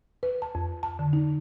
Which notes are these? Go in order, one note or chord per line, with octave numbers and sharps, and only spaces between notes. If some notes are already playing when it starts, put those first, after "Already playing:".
B4
A5
F2
A5
D3
D#4